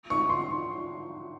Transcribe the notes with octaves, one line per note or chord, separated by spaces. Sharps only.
C#6
C6